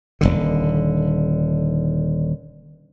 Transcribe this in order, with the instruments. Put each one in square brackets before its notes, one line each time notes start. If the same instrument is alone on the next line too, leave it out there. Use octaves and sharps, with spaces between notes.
[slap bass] D#1 B1 D3